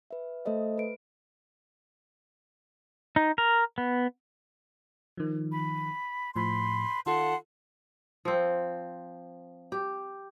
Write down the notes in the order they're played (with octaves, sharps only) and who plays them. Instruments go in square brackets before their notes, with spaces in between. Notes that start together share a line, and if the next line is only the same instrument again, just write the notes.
[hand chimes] B4 E5
A3 A4 C5 D#5 E5
B4 D7
[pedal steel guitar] D#4
A#4
B3
[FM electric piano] D#3 F3
[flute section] B5
[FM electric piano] A2 F3 [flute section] B5 C6
[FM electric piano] D#3 F4 A4 [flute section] F#5 A5 C6
[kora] F3 C4
G4